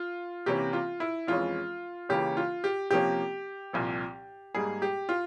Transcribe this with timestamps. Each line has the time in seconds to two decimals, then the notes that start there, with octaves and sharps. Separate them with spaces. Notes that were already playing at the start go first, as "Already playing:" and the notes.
Already playing: F4
0.46 C3 E3 A#3 C#4 G4
0.73 F4
1.00 E4
1.27 F2 E3 G#3 C#4 F4
2.09 C#2 C#3 E3 A#3 C#4 G4
2.37 F4
2.64 G4
2.91 C3 F3 A#3 C#4 G4
3.73 C2 A#2 F3
4.55 G#2 G3 A#3 G#4
4.82 G4
5.09 F4